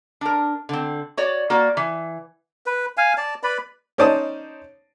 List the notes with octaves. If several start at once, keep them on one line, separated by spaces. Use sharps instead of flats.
D4 A#4
D3 C4
F#4 C#5 D5
A#3 F#4 D5
E3
B4
F5 G#5
D5 A5
B4 D5 B5
C#4 D#4 C5 D5 A5 D#6